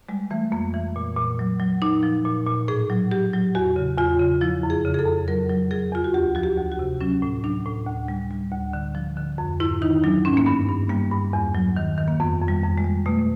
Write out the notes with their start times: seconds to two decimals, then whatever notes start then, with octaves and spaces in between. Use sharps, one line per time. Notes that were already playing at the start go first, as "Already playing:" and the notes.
0.09 G3 G#3
0.31 E3 A3
0.52 F2 A#3
0.74 E3
0.96 A#2
1.17 A#2
1.39 F#3
1.60 F#3
1.82 A#2 D#4
2.03 F3
2.25 A#2
2.46 A#2
2.68 A2 G#4
2.90 F#3
3.11 F#3 G4
3.33 F#3
3.55 E2 F#4
3.76 C#3
3.98 E2 F4
4.20 C#3
4.41 F3 E4
4.63 F2
4.70 G#4
4.85 C#3
4.94 G#4
4.99 A4
5.06 F2
5.28 F#3 A#4
5.49 F#3
5.71 F#3 G#4
5.92 E2 F4
6.04 F#4
6.14 D2 G4
6.35 F3 F#4
6.43 G4
6.57 D2
6.72 F#4
6.79 C3
7.01 F#3 C#4
7.22 A2
7.44 F#3 D4
7.66 A2
7.87 D2
8.08 G3
8.31 G3
8.52 D2
8.73 D3
8.95 F3
9.17 D3
9.38 F2
9.60 G#2 E4
9.82 D#3 D#4
10.04 F#3 D4
10.25 G#2 C#4
10.37 A#3
10.46 G2 B3
10.69 G2
10.90 G3 A#3
11.11 G2
11.33 E2
11.55 F#3
11.76 D#3
11.98 D#3
12.08 A#3
12.20 F2 B3
12.41 F2
12.48 G3
12.63 F2
12.78 G#3
12.84 G3
13.06 B2 A3